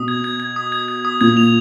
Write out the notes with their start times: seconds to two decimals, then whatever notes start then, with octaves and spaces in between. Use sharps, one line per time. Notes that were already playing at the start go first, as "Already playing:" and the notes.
Already playing: B2 D#6
0.08 G#6
0.24 G#6
0.40 G#6
0.56 D#6
0.72 G#6
0.88 G#6
1.05 D#6
1.21 A#2 G#6
1.37 F7